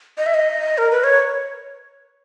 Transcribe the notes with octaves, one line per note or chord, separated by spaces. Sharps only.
D#5
E5
D#5
A#4
B4
C#5